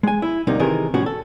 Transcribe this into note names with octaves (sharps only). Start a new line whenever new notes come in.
G#3 G#5
E4
D2 C3 G3 A#3 D#4
C3 D#3 E3 G#4 A#4
C2 A2 F3 C#4 F#4
A4